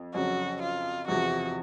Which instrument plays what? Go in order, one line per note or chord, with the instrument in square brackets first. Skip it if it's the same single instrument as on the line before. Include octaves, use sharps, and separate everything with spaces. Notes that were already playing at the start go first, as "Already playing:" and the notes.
Already playing: [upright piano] F2
[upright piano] F2 C#3 F#3 [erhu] F#4
[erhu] F4
[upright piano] E2 C3 F3 [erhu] F#4